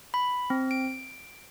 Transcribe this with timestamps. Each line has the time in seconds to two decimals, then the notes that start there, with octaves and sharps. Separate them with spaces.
0.14 B5
0.50 C4
0.71 D7